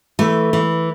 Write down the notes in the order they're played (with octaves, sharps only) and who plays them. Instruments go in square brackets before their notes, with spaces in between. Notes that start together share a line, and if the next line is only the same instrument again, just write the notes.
[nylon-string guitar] E3 A3
E3